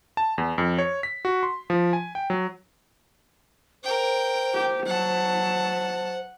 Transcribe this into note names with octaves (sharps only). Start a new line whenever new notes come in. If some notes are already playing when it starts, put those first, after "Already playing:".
A5
E2
F2
C#5
B6
F#4
C6
F3
G#5
G5
F#3
A#4 C5 G5
G4
F#3 F#5 A5